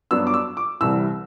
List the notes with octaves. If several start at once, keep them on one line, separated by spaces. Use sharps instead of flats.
G2 F#3 B3 D4 E6
D6
E6
D6
C2 C3 E3 G3 E6